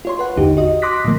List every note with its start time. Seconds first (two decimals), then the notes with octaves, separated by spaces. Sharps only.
0.05 F4 C#5 C6
0.19 B4 F#5
0.36 G#1 E2 D3 D#4 G4
0.57 F#4 D#5
0.82 C6 D6 D#6 F#6 A#6 B6
1.05 A#2 D3 F3 A#3